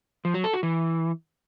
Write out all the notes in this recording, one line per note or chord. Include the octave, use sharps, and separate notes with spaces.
F3
F#3
A4
F#4
E3